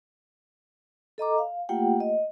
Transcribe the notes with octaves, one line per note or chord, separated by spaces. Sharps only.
A4 D#5 A#5 D6
F5
A3 A#3 F4 G4 F#5 G5
D#5